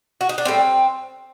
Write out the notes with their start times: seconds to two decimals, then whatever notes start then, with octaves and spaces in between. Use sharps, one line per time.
0.21 F#4
0.29 D#4
0.38 D4
0.45 A2 G3 C4